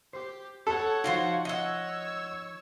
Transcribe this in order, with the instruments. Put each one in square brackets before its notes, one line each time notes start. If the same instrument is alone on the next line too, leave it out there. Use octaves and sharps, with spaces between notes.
[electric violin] G4 [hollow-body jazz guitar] C5
[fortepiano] A4 [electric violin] C#5 F#5
[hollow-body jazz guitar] F3 D#4 [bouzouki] F4 F#4 C5
[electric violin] C#5 E6 [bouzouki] D#5 F#5